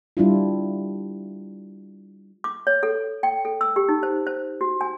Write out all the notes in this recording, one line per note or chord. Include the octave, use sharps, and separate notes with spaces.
G3 D4 E4 F4
D6
C#5
A4
G5
A4
E6
G4
D#4
C5
C5
F#4
G#5